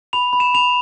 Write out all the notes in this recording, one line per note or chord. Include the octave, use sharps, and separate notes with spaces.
B5 F7
B5
E7
B5 F7